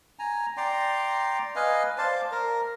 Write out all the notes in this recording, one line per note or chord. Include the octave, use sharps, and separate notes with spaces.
G#5 A#5
D5 G5 A#5 C6
B4 D#5 F5 G#5
C5 D5 F5 A5
A#4